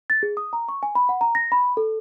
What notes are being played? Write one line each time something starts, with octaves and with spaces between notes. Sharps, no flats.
A6
G#4
D#6
A#5
C#6
G#5
B5
F#5
A#5
A#6
B5
A4